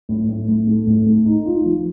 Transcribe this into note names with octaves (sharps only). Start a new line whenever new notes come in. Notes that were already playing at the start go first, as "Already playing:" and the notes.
A2
A2
A2
A3
A2
A3
D#4
F4
F3